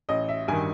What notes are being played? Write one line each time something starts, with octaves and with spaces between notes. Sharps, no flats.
A1 D#5
E5
G2 D#3 G#5